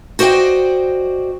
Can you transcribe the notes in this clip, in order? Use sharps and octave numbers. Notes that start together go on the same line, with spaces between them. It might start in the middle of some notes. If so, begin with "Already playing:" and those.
F#4 C5 D5 D#5 G5